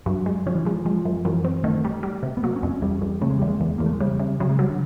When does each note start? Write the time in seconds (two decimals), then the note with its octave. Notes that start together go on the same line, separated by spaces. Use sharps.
0.06 G2 F#3
0.26 G#3
0.46 F3 C#4
0.55 E3
0.65 F3 G#3
0.85 F3 G#3
1.05 F#2
1.25 F#2 E3
1.45 C4
1.64 D#3 A3
1.85 G3
2.03 G3
2.23 C3
2.37 B3
2.43 F#3 A#3
2.56 C#4
2.63 F2
2.69 C#4
2.82 F2 G3
3.01 F2
3.21 C#3 A3
3.30 G#3
3.39 E2 G3
3.48 G#3
3.60 E2
3.78 E2 A#3
3.86 A3
3.93 G#3
4.00 C#3 G3
4.20 C#3
4.40 C#3 F#3
4.50 G#3
4.59 F#3 G3
4.69 D3